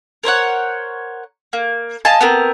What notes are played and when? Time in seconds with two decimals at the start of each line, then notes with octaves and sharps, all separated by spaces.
0.24 A#4 C5 C#5 F#5
1.53 A#3
2.05 D#5 F5 G#5 A5
2.21 B3 C4 A#4